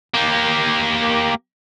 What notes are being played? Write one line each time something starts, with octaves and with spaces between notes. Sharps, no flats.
A#3 G4